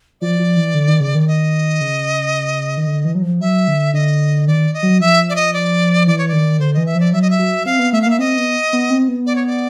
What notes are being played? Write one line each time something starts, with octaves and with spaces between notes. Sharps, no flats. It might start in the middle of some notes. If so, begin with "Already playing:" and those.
F3 D5
F3
E3
D3
D#3
C#3
D#3
D#5
C#3
D#3
D3
E3
F#3
F3
F#3 E5
D3
D3 D#5
D#3 D5
D#5
F#3
F3 E5
D5
D#5
D5
E3 D5
C#5
D#3 D5
D3 C5
E3 D#5
E5
F3
D5
F#3 E5
D#5
E5
F#3
C4 F5
B3
A3 E5
F5
A#3 E5
C4 D#5
B3
B3
C4
B3
D5
C#5
D5